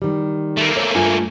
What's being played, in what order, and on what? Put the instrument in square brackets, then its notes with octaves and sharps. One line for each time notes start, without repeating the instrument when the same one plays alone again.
[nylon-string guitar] D#3 G3
[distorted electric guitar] A3 A#3
[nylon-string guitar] C#5
G2 F4 G#5